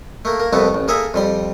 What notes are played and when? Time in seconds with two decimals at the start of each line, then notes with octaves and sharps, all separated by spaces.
0.25 A3 A#3
0.40 A#3
0.53 C2 F2 A3 B3 A5
0.74 A1
0.88 A#3 G#4 A4 E5
1.14 F2 G3 C6